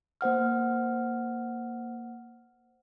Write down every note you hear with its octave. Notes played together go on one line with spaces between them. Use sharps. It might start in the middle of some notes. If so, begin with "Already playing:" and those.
A#3 C5 F#5 F6